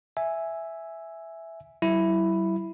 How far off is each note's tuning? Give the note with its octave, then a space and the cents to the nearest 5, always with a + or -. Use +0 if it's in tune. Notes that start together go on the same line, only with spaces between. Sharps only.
E5 +0 G#5 +0
F#3 +45 E4 +0